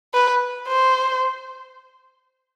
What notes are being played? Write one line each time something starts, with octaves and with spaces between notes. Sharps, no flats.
B4
C5